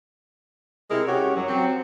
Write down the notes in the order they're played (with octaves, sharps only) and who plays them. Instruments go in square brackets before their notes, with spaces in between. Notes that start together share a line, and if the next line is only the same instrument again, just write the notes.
[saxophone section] C3 G#3 E4 A#4
C#4 F#4 G4 C#5
F#2 F#3
F#3 C4